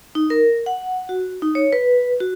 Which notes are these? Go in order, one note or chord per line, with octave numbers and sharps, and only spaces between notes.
D#4
A#4
F#5
F#4
D#4
C#5
B4
F#4